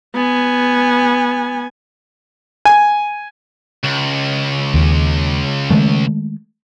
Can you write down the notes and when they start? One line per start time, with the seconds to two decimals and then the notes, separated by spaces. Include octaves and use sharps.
0.15 B3 G#5
2.65 G#5
3.83 C#2
4.74 D#2
5.71 D#3 G#3 A3